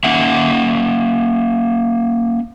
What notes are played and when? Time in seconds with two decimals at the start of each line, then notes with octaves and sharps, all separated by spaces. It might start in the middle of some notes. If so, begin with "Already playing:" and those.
0.04 A#3 C#4 E5 F#5